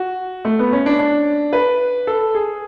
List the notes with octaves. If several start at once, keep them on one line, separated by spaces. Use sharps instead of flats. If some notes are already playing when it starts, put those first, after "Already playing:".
Already playing: F#4
A3
B3
C#4
D4
D4
B4
A4
G#4